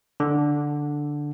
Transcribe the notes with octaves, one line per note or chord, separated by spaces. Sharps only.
D3